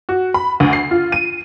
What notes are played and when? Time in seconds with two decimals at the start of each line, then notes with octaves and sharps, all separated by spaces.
0.09 F#4
0.34 B5
0.60 D2
0.73 C7
0.91 F4
1.12 D#7